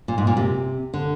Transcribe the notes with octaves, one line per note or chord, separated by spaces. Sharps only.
A#2
G#2
A#2
C3
D3